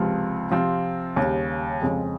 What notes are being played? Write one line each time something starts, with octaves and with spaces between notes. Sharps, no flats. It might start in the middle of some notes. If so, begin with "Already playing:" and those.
Already playing: C#2 C3 F3 C4
C3 F3 C4 F4
D#2 C#3 G3
F2 C#3 F3 G#3 C4